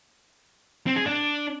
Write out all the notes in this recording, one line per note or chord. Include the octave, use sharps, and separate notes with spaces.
C4
G#4
D4